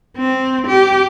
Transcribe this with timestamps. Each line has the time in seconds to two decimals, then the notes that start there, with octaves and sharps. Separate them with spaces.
0.17 C4
0.68 G4